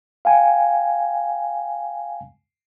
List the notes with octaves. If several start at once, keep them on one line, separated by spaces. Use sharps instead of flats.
F5 G5 G#5